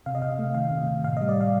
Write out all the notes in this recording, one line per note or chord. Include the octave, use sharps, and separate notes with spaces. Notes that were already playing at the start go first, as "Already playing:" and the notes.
C3 F5
D#5
C3 F5
A3
D#3 F5
C3
C3
A2 F5
D#5
G3
D5
A2 F5